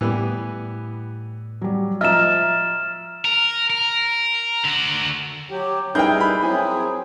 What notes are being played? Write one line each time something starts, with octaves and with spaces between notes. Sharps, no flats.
A2 E3 G3 B3
F#3 G3
F3 D#5 E5 A#5 E6 F6 A6 E7
A#4
A#4
D3 F#4
F#3 G4
G3 D#4 E4 G#4 A#4 B4 G5 G6
B5
F#3 C4 E4 G#4 G#5